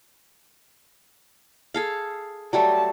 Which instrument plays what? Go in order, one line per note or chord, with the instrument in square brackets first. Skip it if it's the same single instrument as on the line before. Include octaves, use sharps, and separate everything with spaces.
[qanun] G#4 A4 F5
[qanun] F#3 G3 A3 [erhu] A5